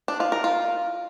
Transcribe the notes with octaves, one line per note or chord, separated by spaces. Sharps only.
D4
F4
A#4
F4